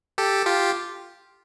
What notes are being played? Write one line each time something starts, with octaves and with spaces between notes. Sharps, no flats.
G4 A4
F4 G4